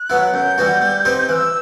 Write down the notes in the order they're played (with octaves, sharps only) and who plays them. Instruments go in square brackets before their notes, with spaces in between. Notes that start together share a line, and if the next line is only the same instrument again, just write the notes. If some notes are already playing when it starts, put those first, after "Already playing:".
Already playing: [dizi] F#6
[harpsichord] F#3 B3 E4
[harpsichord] F#2 [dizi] G6
[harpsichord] E3 G3 B3 F#4
G3
C4 D#4 G4 B4
[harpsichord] E3 [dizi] F#6
[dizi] E6